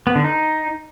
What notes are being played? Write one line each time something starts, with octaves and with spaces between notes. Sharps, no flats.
B3
D3
D#4